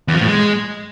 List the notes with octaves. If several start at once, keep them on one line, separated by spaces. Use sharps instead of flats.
E2
F3
A2
G#3